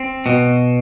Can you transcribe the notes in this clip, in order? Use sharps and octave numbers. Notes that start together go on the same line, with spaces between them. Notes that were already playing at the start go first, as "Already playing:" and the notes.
Already playing: C4
B2